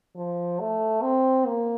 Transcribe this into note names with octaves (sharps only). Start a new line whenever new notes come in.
F3
A3
C4
A#3